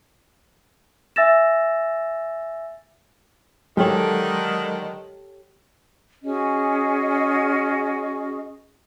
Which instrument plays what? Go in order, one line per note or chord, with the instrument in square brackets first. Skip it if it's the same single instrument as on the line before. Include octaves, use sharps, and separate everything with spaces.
[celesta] E5 G#5 E6 A6 A#6 E7
[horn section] D3 D#3 [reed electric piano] F#3 G#3 [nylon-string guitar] G4 A4 C#5
[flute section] C#4 F#4 G#4 D#5